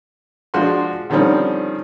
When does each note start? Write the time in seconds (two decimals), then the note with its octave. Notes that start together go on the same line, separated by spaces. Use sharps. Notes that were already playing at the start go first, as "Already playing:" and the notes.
0.54 F3 G#3 D4 F#4 F5 C6
1.10 D3 D#3 F3 G3 C4 C#4